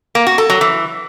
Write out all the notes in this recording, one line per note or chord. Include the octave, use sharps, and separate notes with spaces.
A#3
F#4
A4
F#3
E3